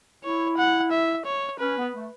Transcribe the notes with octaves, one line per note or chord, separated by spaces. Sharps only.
E4 C#5
F#5
E5
C#5
C#4 B4
B3
A3